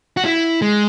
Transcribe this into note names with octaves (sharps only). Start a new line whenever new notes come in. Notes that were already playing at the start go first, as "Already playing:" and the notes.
F#4
E4
G#3